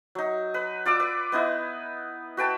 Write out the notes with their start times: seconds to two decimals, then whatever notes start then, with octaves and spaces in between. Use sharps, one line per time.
0.15 F#3 D#4
0.54 B4
0.85 F4 D5 D6 E6
1.00 B4
1.32 B3 D#4 E4 B4
2.37 F#4 B4 G5 A5